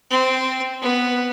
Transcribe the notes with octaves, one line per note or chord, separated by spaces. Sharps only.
C4
B3